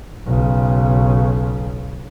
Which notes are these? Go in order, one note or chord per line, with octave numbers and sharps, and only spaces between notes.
B1 C#3